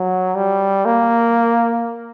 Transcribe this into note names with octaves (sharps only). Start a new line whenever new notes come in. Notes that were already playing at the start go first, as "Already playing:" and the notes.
Already playing: F#3
G3
A#3